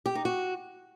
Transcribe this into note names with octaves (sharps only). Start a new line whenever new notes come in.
G4
D#4
F#4